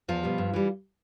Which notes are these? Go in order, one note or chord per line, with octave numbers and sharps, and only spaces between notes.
E2 F3 F4
B2 G3
G2
E3 G3